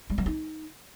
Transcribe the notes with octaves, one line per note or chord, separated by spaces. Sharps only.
G3
F#3
D#4